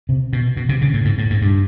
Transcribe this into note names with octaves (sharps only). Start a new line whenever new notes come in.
C3
B2
B2
C3
C#3
A2
G#2
A2
G#2
G2